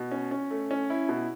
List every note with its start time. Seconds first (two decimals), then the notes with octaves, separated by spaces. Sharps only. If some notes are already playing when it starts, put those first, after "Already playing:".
Already playing: B2
0.11 C#4
0.31 C#4
0.51 A3
0.71 C#4
0.90 E4
1.09 B2